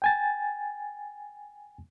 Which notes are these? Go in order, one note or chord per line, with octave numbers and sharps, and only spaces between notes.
G5 G#5 A6